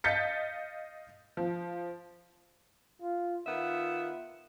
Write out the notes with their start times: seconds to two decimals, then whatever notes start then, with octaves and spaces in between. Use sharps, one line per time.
0.04 D#5 F5 G6 A6 B6 C#7
1.37 F3
3.02 F4
3.46 D#3 B3 F4 E5